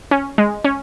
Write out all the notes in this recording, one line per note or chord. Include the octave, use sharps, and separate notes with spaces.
C#4
G#3
C#4